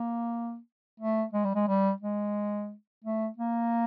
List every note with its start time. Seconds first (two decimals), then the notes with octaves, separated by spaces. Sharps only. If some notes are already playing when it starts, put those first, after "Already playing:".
Already playing: A#3
1.00 A3
1.33 G#3
1.44 G3
1.55 G#3
1.68 G3
2.02 G#3
3.04 A3
3.38 A#3